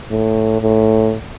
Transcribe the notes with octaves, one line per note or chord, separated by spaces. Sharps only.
A2
A2